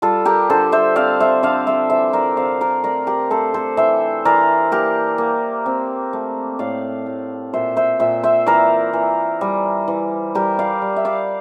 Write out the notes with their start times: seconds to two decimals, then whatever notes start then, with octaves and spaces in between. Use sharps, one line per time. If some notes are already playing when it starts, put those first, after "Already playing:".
0.02 G3 F4 A4
0.26 G4 A#4
0.50 D3 A4 C5
0.72 C5 E5
0.96 C4 D5 F5
1.20 C5 E5
1.43 D3 D5 F5
1.67 C5 E5
1.90 E3 C5 E5
2.13 A#4 D5
2.37 C3 D5 F5
2.61 A#4 D5
2.84 A3 A#4 D5
3.07 G4 A#4
3.30 A3 A4 C5
3.54 A4 C5
3.77 E3 C5 E5
4.25 E3 A#4 D5
4.72 A#3 G4 A#4
5.18 A#3
5.66 C4
6.13 A3
6.59 A2 D5 F5
7.06 A2
7.53 A#2 C5 E5
7.77 C5 E5
8.00 A#2 C5 E5
8.23 C5 E5
8.47 E3 A#4 D5
8.93 E3
9.41 G3
9.88 E3
10.35 G3 G4 A#4
10.59 D5 F5
10.82 G3
10.96 E5
11.05 D5 F5